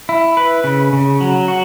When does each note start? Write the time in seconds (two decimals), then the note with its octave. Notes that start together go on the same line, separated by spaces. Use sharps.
0.09 E4
0.37 B4
0.64 C#3
0.93 C#3
1.21 F#3
1.48 F#4